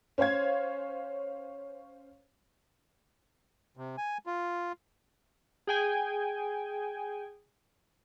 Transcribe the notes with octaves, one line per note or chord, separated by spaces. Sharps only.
C#4 C5 C#5 F5 G#6
C3
G#5
F4
G#4 G5 G#5